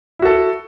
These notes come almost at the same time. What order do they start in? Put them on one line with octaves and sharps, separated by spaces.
E4 F#4 A4